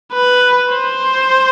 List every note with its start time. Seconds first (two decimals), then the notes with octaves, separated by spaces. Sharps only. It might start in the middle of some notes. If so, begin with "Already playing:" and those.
0.13 B4
0.74 C5